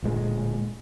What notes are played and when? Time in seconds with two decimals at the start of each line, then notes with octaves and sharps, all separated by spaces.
0.02 D1 A#2 G#3